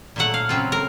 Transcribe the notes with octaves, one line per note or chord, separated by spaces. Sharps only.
A#2 F#3 A3 F#5
F5
C#3 F#3 C4 F4
A#4